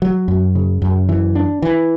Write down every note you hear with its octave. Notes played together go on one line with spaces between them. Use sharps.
F#3
F#2
C#3
F#2
E3
D4
E3